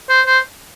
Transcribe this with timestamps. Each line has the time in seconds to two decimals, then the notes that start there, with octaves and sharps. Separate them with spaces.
0.09 C5
0.27 C5